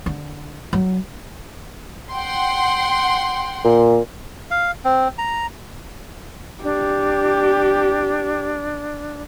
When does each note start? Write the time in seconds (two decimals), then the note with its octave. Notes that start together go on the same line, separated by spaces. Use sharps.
0.06 D3
0.73 F#3
2.11 F#5 G5 C6
3.64 A#2
4.51 F5
4.85 C4
5.18 A#5
6.64 D4 G4